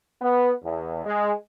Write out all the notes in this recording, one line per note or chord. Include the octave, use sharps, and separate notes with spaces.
B3
E2
G#3